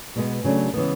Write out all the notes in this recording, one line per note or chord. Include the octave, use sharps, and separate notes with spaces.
B2 G#3 B3
C#3 F#3 A3 D4
C#3 E3 G#3 B3